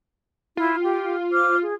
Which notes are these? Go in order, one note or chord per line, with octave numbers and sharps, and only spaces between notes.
E4 F4
G4 G5
C5 D6 F6
G#4